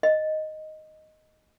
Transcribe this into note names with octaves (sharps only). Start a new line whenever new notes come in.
D#5